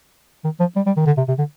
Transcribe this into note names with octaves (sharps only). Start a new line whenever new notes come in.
D#3
F3
G3
G3
D#3
D3
C3
C3
D3